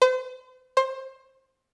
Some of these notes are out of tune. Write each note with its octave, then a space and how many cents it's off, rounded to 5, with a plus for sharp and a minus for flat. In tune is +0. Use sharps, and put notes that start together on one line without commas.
C5 -40
C5 +20